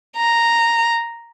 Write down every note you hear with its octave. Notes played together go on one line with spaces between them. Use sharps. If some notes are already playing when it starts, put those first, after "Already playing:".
A#5